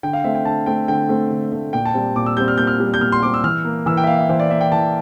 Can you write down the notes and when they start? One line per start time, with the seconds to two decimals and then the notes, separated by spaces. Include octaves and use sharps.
0.03 D3 G5
0.13 F5
0.24 A3 C4 E5
0.35 G5
0.45 D3 A5
0.66 A3 C4 G5
0.88 D3 G5
1.09 A3 C4
1.31 D3
1.52 A3 C4
1.73 A#2 G5
1.85 A5
1.94 G3 C4 G5
2.16 A#2 D6
2.26 E6
2.37 G3 C4 G6
2.48 F6
2.58 A#2 G6
2.67 F6
2.80 G3 C4
2.94 G6
3.01 A#2 F6
3.12 C6
3.22 G3 C4 D6
3.34 E6
3.44 E3 F6
3.65 A#3
3.86 E3 E6
3.97 G5
4.04 E5
4.07 A#3 F5
4.18 E5
4.29 E3 C5
4.39 D5
4.50 A#3 E5
4.61 G5
4.72 E3 A5